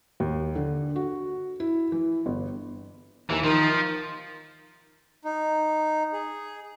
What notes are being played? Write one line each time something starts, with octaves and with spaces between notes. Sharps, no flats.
D#2
D3
F#4
E4
E3
G1
D#2 E3
D#3 F3
D#4
G#4